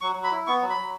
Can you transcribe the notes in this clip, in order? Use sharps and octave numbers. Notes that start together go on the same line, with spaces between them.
F#3 C#6
F#3
B5
E4
B3 C#6
F#3
B5
F#3